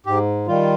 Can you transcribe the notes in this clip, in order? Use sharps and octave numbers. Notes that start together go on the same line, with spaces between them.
G#2 G4
D#3 G3 F4